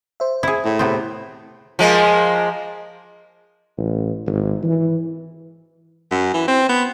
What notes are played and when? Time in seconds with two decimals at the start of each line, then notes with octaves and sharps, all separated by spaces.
0.20 C5 E5
0.43 E4 G#4
0.65 A2
0.79 C3 B3 C4
1.79 F3 G#3 A#3
3.77 A1
4.27 G#1
4.63 E3
6.11 F#2
6.34 E3
6.48 C4
6.69 B3